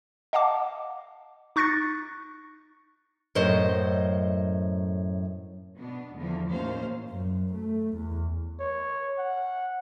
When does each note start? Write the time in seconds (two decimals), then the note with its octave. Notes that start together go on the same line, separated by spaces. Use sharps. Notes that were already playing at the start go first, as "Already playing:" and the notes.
0.33 D#5 F5 F#5 A5 D6
1.56 D#4 C#6 F#6 A6 A#6 C#7
3.35 F#2 A2 A3 C5 D#5
5.76 B2 B3 D4
6.15 E2 D3 E3 F3
6.48 D#2 A2 C#4 C5 F5
7.09 F#2
7.54 A3
7.94 E2
8.60 C#5
9.19 F#5